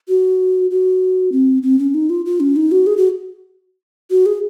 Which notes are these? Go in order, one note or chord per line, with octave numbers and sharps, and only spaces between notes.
F#4
F#4
C4
C4
C#4
D#4
F4
F4
C#4
D#4
F#4
G#4
F#4
F#4
G#4